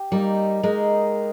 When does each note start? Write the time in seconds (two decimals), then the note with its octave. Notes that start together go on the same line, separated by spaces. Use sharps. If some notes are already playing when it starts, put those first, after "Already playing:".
Already playing: G4
0.11 G3 A#3 D#4 A#4
0.63 G#3 D#4 A#4 D#5